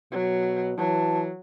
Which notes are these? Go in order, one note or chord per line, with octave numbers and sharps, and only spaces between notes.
B2 F#3
E3 F#3 A5